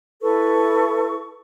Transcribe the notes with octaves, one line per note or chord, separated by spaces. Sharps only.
E4 A4 B4 C#6